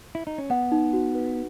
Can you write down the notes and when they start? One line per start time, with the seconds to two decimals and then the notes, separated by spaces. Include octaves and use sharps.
0.15 E4
0.27 D#4
0.38 C#4
0.50 B3 F#5
0.72 D#4
0.93 F#4
1.15 B4